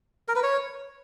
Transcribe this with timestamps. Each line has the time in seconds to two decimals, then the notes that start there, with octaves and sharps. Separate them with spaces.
0.28 A#4
0.36 B4
0.43 C#5